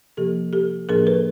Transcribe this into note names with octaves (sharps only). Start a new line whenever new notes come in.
C3 F3 A#3 G4 A4
G4 A4
A2 F3 A#3 D4 G#4 A#4
A4 B4